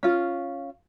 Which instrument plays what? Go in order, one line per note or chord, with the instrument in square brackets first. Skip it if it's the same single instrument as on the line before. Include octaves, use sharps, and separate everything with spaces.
[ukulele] C#4 F4